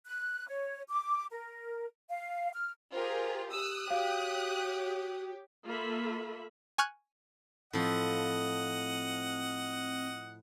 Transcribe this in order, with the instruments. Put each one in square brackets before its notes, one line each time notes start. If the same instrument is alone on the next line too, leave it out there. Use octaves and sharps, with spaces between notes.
[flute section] F#6
C#5
D6
A#4
F5
F6
[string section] F4 G4 [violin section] G#4 A#4 [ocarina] C5
[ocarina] G4 [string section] D#6 F#6 [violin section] E6
[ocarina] F#4 [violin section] G4 C#5 [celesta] F5
[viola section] A#3 F4 A4 E5 B5
[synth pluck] G#5 C#6 F6 F#6 G#6
[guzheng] A2 F3 [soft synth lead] C4 [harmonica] D#5 F#5